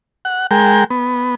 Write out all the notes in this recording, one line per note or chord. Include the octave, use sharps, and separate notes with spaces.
F#5
G#3 A#4 G5
B3